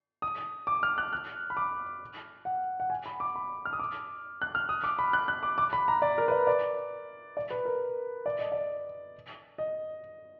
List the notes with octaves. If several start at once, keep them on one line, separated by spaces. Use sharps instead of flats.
D#6
D6
F6
F#6
F#6
B5
D6
F#5
F#5
G#5
B5
D6
B5
F6
D#6
D6
F#6
F6
D#6
D6
B5
F#6
F#6
D6
D6
B5
A#5
D5
A#4
B4
D5
D5
D5
B4
A#4
D5
D#5
D5
D#5